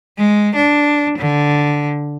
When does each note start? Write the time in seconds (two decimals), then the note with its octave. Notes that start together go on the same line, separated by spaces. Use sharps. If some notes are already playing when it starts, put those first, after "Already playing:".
0.18 G#3
0.56 D4
1.19 D3